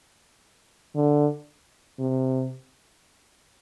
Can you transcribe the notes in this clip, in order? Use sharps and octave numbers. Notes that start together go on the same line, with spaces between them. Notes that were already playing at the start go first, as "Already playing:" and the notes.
D3
C3